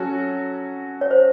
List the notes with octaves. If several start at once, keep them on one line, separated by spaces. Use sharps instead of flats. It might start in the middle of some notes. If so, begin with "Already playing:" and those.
Already playing: F#3 C#4 F#4 A4
C#5
C5